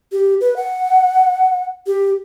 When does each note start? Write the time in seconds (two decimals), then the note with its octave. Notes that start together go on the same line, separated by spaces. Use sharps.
0.12 G4
0.41 B4
0.56 F#5
1.87 G4